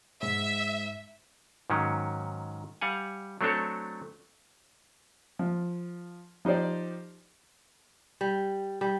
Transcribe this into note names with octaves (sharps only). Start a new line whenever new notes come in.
G#2 E5
G#2 D#3 F#3 C#4
G3 F5 F#5 G#5
F#3 A3 C4 D4 A4 C#5
F3
F3 D#4 G4 C5 D5
G3
G3